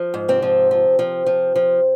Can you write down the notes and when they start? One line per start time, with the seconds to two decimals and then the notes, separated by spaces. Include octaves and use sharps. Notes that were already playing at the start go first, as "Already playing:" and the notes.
Already playing: F3
0.14 G#2
0.28 C3 C4
0.42 F3
0.71 F3
0.99 F3
1.26 F3
1.56 F3